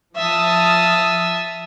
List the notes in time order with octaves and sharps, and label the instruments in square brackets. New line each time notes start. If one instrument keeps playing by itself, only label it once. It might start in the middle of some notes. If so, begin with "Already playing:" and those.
[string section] F3 D#6 F6 [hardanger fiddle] E5 A5